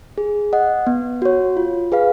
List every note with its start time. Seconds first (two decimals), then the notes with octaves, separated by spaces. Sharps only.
0.18 G#4
0.53 D#5 F#5
0.87 B3
1.22 F#4 C#5
1.57 F4
1.92 G#4 B4 F5